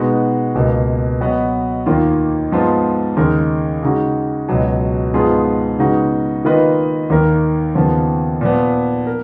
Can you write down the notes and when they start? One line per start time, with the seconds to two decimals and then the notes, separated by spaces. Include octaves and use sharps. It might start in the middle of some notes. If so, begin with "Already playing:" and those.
Already playing: B2 G#3 B3 D#4 F#4
0.55 C#2 B2 A#3
1.21 F#3 B3 F#4 B4 D#5
1.86 D#2 D#3 A#3 F4
2.52 G#2 F3 B3 F4
3.17 D#2 C#3 G#3 D#4 A#4
3.82 C#3 G#3 D#4 F#4
4.49 C#2 B2 F#3
5.14 G#2 F3 B3 F4 G#4
5.79 C#3 G#3 B3 D#4 F#4
6.45 D#3 A#3 F4 B4 D#5
7.10 D#2 D#3 A#3 D#4 A#4
7.75 D#2 C#3 F3 B3 F4
8.41 A#2 F3 B3
9.07 A#4